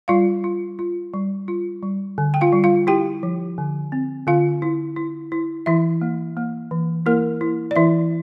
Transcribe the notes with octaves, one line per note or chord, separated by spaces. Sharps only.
G3 F4 F5
F4
F4
G3
F4
G3
D3
G5
F4 F5
G3
F4 F5
E4 G4 G5
F3
D3
C4
D3 F4 F5
E4
E4
E4
E3 E4 E5
A#3
A#3
E3
A#3 E4 A#4
E4
D5
E3 E4 E5